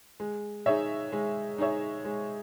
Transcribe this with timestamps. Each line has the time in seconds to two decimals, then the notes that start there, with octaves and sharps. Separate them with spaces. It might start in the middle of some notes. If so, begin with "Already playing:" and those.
0.20 G#3
0.66 D#4 G#4 C#5 E5
1.12 G#3
1.58 D#4 G#4 C#5 E5
2.05 G#3